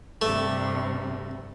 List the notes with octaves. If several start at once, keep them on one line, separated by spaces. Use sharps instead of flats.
G2 C3 A3